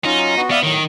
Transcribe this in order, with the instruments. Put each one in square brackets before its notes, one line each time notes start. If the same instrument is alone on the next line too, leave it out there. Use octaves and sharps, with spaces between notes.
[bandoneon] F#3 C#4 F4 [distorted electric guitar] D#4
[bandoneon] B3 F#4
[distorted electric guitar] B3 [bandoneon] D5 E5 F5
[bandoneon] A2 F#3 [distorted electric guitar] D#3